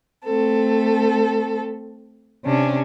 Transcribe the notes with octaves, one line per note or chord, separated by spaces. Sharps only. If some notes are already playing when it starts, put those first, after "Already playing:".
A3 C4 A4
C3 C#4 D4